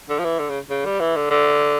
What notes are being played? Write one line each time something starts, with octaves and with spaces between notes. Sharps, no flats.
D3
F3
E3
D3
C#3
C#3
G3
E3
D3
D3